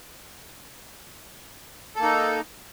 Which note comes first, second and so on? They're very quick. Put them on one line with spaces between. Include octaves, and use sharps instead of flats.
A4 A#3 D#4